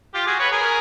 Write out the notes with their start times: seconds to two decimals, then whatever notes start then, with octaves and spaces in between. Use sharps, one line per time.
0.14 F4 G4
0.27 F#4 G#4
0.39 B4 C#5
0.52 G#4 A#4